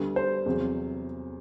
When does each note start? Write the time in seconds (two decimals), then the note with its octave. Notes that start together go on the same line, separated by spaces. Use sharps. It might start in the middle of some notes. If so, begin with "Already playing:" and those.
Already playing: D2 D3 G3 B3
0.16 C5
0.46 E2 C3 F#3